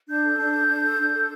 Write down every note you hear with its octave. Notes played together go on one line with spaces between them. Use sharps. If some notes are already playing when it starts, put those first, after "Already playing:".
D4 G6
A4
D4
A4
D4
A4
D4
A4